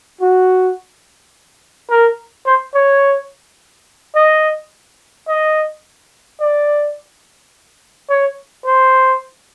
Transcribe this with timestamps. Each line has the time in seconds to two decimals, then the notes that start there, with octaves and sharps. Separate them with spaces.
0.21 F#4
1.90 A#4
2.46 C5
2.74 C#5
4.16 D#5
5.28 D#5
6.40 D5
8.09 C#5
8.66 C5